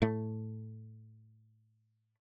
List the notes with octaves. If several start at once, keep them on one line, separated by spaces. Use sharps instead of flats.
A2 A3